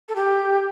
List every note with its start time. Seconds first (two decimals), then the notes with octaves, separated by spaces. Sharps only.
0.09 A4
0.16 G4